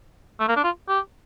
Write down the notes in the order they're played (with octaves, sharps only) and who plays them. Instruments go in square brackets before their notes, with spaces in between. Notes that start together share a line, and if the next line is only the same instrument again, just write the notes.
[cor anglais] A3
A#3
D4
F4
G4